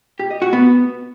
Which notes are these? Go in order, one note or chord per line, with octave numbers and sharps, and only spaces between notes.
G4
D#5
F#4
B3